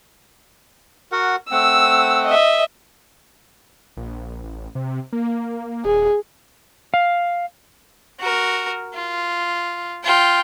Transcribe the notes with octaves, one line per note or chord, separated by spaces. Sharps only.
F#4 A#4 F#5
A3 C4 F#5 E6
D#5 E5
A#1
A1
C3
A#3
D#1 G#4
F5
F#4 A#4
F4
F4 G5